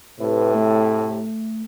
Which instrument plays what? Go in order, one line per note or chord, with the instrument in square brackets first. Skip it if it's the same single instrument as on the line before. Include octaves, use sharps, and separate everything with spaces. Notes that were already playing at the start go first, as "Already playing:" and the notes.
[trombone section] A2 C3 [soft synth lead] B4
[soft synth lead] A3